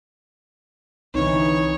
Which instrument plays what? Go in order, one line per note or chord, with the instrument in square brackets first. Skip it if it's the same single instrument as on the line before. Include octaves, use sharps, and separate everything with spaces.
[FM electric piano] C2 D3 [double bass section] E3 [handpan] C4 D#4 [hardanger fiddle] C#5